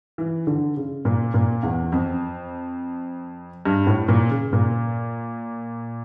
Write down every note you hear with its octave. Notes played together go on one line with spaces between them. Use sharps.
E3
D3
C#3
A#2
A#2
E2
F2
G2
A2
A#2
C#3
A#2